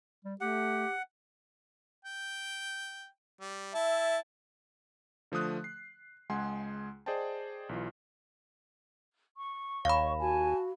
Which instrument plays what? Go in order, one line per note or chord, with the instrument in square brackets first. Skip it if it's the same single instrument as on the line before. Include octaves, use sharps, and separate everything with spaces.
[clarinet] G3
[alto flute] A3 [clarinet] G4 [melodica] F#5
[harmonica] G5
G3
[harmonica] E4 A5 [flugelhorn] E5
[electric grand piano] D3 F3 A3 D#6 F#6
C7
C#2 G#3 G#4 F#5 G#5 C6
G#4 C5 D5 D#5 G5 A5
B1 E3 F4
[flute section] C#6
[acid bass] D#2 [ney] C#5 [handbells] F5 B5
[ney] F#4 [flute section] G#5 A5